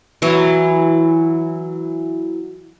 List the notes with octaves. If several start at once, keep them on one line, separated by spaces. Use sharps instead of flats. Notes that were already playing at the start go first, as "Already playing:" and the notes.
E3 F#3